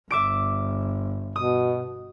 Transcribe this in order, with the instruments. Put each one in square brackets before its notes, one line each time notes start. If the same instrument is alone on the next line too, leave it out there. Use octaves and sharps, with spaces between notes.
[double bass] G1 [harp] E5 D6 D7
[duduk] B2 [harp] D#6